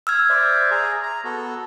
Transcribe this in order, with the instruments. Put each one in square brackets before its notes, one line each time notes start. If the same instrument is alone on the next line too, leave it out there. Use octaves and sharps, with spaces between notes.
[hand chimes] E6 F6 G#6
[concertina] C5 D5 E5
G#4 A#5
A#5
B3 F#4 A4